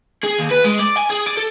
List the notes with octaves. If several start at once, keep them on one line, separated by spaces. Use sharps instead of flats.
G#4
D#2
B4
G#3
D5
G#5
G#4
D5
A4